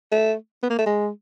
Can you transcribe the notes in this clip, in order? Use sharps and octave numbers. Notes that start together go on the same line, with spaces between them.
A3
B3
A#3
A3
G#3